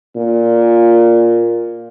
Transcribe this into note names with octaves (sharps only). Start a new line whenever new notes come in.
A#2